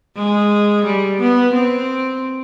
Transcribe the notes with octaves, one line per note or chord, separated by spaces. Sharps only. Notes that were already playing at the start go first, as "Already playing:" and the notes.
G#3
G3
B3
C4